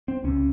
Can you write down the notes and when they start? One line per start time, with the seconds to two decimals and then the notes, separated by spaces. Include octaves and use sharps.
0.08 C4
0.24 C#2 C3 C#4